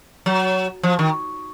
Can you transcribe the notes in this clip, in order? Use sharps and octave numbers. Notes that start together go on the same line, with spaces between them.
F#3
F3
D#3